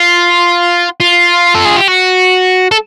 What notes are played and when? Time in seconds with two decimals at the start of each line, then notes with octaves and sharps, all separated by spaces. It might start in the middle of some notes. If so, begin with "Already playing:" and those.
Already playing: F4
1.00 F4
1.55 A4
1.65 G#4
1.77 G4
1.88 F#4
2.71 A4